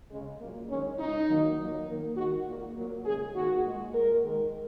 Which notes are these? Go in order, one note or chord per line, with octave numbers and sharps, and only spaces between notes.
C#3 G#3
A#2 F#3 A#3
D#3 G#3 C#4
C#3 G#3 D#4
D#3 F#3 A#3
A#2 F#3 A#3
D#3 A#3
D#3 G#3 F#4
A#2 A#3
A#2 F#3 A#3
C#3 G#3 G#4
D#3 A#3 F#4
A#2 G#3
A#2 G#3 A#4
D#3 G#3